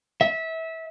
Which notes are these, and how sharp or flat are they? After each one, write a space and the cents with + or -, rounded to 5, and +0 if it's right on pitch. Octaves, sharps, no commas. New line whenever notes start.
E5 -25